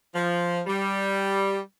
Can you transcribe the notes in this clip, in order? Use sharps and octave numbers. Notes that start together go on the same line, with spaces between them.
F3
G3